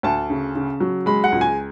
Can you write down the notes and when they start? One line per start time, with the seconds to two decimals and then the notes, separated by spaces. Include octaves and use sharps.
0.03 D2 A5
0.30 C#3
0.55 C#3
0.80 F#3
1.06 G#3 B5
1.24 F#5
1.32 C#2
1.41 G#5